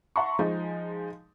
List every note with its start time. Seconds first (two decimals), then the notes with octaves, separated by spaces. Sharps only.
0.16 E5 F#5 A5 A#5 C6 C#6
0.39 F3 G#3 D#4